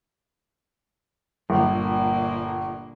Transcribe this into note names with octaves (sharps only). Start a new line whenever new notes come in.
G1 A#2 D3 A#3